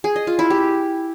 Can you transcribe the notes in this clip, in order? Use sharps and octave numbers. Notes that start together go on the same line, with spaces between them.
G#4
D#5
F4
E4
G4